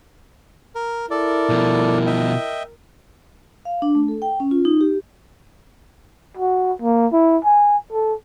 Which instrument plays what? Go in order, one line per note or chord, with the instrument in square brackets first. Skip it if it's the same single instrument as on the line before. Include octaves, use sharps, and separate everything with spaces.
[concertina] A#4
[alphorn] E4 [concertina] A4 D5 [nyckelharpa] A#4
[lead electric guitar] B2 F3
[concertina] D#5 E5 G5
[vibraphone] F5
D4
A3
A4
G5
C#4
F4
D#4
G4
[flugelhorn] F#4
A#3
E4
G#5
A4